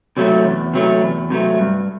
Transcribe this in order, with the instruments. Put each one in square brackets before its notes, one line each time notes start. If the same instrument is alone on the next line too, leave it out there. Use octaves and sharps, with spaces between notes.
[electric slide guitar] C3 F#3 A3
E2
C3 F#3 A3
E2
C3 F#3 A3
G2